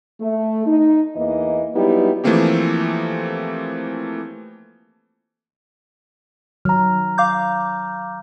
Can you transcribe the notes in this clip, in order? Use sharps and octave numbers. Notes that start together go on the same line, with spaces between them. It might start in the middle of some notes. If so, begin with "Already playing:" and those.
A3
D#4
E2 E3 A#3 D#5
F#3 G3 B3 D#4 E4 G4
E3 F3 A3 A#3 C4 G4
D#3 F#3 A#5 F6
F5 D6 G6